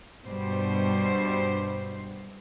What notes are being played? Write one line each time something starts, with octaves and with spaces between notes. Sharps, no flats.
G2 B2 G3 C5